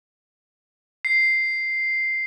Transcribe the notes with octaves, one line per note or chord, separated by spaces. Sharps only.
C7